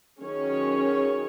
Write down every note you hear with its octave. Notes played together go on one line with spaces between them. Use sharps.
D#3 F#3 C#4 G#4 C#5